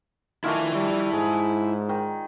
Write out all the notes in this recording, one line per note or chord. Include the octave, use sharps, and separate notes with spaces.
D#3 A3 D4 E4 F4 E5 G#5
G3
G#2 G#4
D#3